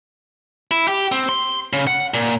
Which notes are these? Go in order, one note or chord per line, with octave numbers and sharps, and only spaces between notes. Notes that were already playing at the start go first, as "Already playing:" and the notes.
E4
G4
C4
C6
C#3
F#5
A#2